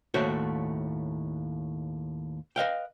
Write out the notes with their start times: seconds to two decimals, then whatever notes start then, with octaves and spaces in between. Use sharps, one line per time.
0.14 D#2 A2 A3 F#4 C5 C#5
2.56 B4 D#5 F5 G5